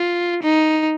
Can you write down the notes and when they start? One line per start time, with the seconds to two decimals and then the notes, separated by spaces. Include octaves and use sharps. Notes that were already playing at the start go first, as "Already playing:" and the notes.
Already playing: F4
0.43 D#4